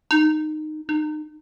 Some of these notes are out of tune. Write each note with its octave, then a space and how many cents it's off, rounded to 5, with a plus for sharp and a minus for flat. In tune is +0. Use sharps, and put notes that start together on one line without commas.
D#4 -15
D#4 -30